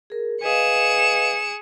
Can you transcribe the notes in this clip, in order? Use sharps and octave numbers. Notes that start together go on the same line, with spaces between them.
G#4 A#4
G#4 B4 D#5 F5 C#7 E7